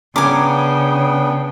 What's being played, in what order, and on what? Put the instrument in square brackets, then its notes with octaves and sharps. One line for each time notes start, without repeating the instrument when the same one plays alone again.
[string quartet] C#3 [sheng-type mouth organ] B3 D4 G5 [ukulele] C#4 A#5 [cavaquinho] G#5 D6